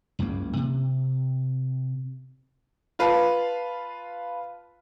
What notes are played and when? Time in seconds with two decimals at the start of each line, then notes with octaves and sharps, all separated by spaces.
0.19 F#1 C#2 G2 A#3
0.57 C3
2.99 F4 B4 F5 A5